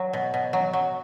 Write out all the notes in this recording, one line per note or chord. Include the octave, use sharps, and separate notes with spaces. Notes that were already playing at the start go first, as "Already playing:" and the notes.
Already playing: F#3
B2
B2
F#3
F#3